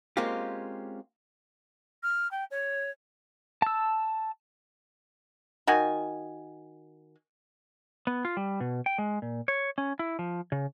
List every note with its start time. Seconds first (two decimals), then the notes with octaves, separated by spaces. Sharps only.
0.17 G#3 A#3 C4 C#4 F4 G4
2.03 F6
2.31 G5
2.51 C#5
3.62 A5 E6
5.67 D#3 F#4 G#5
8.07 B3
8.25 F4
8.37 G3
8.60 B2
8.86 G5
8.98 G#3
9.22 A#2
9.48 C#5
9.78 C#4
9.99 E4
10.19 F3
10.52 C#3